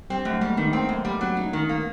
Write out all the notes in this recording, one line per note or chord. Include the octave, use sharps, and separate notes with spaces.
G3 C4
F#2 A3
G3 G#3 A#3
D#3 A3 B3
C4
F#2
G3
F#3 B3 C#4
D#4
D#3
A#3